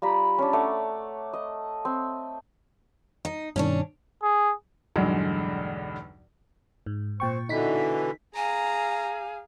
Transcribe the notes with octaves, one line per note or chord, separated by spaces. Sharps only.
G3 F4 A#5 B5
C#4 D4
A3 C#5 D5 F#5
D#5
C4
D#4
G2 B2 D#3 C#4 D4 C#5
G#4
B1 E2 G2 D3 F#3 G#3
G#2
A#2 C4 G5 C#6
B2 D3 E3 D#4 B6
G#4 F5 G#5 A#5